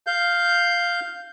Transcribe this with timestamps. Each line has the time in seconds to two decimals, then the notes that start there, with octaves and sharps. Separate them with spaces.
0.07 F5 G6